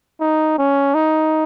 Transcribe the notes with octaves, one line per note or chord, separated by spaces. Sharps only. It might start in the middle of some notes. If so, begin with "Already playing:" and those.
D#4
C#4
D#4